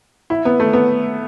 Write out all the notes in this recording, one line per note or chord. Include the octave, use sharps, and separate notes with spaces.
E4
B3
A3
B3